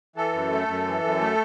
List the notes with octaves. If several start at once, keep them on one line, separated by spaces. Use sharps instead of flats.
E3 A4
F#2
A3
F#2
E3
F#2
A3